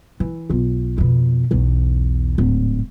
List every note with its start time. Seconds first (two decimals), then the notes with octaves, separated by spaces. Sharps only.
0.20 E3
0.50 B1 F4
0.98 F2 B2
1.51 B1 E2
2.38 D1 G#2